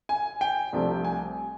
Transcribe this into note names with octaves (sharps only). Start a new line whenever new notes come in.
G#5
G5
C2 C3 F3 A3 D4
G#5